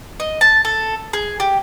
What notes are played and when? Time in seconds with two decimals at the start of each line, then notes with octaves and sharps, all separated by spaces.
0.20 D#5
0.41 A5
0.65 A4
1.13 G#4
1.40 G4